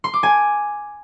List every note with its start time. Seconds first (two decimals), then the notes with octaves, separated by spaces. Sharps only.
0.04 C6
0.14 D6
0.23 G#5